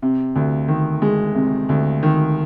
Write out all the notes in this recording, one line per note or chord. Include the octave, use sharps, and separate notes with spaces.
C3
D2
D#3
G#3
C3
D2
D#3